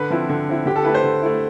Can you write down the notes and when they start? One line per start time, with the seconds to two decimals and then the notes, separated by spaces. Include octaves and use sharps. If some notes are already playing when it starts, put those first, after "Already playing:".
Already playing: D3 B4
0.10 F3 C4 E4
0.29 D3
0.48 F3 C4 E4
0.66 D3 G4
0.76 A4
0.85 A3 E4 B4
0.94 C5
1.04 D3
1.22 A3 E4